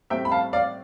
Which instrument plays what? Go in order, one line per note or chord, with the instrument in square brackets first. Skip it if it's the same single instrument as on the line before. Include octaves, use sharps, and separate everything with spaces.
[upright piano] A2 G3 C4 E5 G5
B5
F5 A5
D5 F5